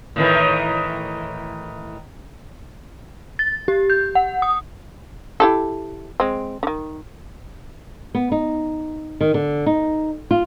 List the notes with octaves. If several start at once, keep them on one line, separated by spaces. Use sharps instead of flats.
A2 D#3 E3
A6
G4
G6
F#5
D#6
E4 G4 A4
G#3 C4
D3 D#3
B3
D#4
D#3
D3
D#4
F4